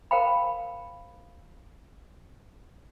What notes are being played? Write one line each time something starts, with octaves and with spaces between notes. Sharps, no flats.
A#4 C5 F5 G5 B5